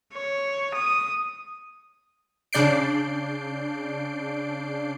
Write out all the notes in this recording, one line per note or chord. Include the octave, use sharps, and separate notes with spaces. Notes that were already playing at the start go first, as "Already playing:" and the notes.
C#5
D#6
C#3 D4 D5 G6 C7 D7